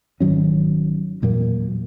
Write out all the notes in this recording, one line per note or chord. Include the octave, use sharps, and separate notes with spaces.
G#1 D#3 F#3 C#4
E2 A#2 F#3 A#3